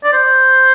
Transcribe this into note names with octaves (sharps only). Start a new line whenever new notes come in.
D5
C5